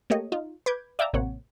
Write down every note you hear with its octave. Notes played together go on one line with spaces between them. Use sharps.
A3 A#3 G4 C#5 D#5
D#4 F4
B4 D6 G6 G#6
D5 E5 F5 G5 A5 A#5
A1 C3 A#3 C4 C#5 F#5